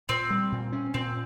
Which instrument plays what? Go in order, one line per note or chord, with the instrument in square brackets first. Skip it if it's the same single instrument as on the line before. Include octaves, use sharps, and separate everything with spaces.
[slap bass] A#2 [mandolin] C4
[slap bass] G3
A#2
C#4
[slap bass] A#2 [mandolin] C4